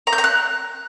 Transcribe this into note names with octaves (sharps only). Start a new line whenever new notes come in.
A#5
G6
A#5
F#6